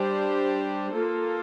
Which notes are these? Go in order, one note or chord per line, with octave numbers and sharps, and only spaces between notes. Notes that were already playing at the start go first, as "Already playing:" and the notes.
Already playing: G3 D4 G4 C5
A#3 F4 A4